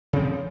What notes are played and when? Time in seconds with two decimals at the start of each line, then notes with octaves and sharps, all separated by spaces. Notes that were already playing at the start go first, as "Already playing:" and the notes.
0.13 C#3
0.16 C4
0.19 F3